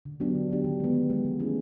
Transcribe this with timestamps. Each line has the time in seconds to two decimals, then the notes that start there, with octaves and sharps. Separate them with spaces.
0.05 D3
0.20 F#3 B3 D4 G4
0.35 D3
0.50 F#3 B3 D4 G4
0.64 D#3
0.80 G#3 B3
0.95 D#3
1.10 G#3 B3
1.25 F3
1.40 A3 C#4 E4 G#4